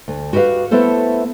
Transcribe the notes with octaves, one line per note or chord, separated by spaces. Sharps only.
D2
F#4 G4 B4 E5 F5
A3 B3 E4 A4 C5